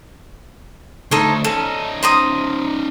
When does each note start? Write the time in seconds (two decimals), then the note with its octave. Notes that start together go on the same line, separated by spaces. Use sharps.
1.11 D2 D#4 A4 C5 C#5
1.44 C#4 D#4 A4
2.03 C5 A#5 D#6